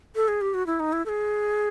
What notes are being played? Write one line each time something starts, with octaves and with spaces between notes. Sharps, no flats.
A4
G#4
G4
F#4
E4
D#4
E4
A4
G#4